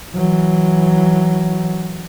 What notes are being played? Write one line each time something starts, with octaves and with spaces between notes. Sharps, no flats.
E3 F#3